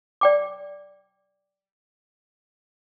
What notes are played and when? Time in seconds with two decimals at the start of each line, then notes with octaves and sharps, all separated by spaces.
0.21 D5 G5 D6